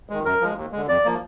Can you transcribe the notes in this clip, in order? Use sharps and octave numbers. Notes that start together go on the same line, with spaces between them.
D#3 G#3
F#2 A#4
F3 G#3
D#2
G#3
D3
F2 D5
F3 A#3